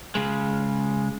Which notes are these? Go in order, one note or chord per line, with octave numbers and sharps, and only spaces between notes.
C#3 G#3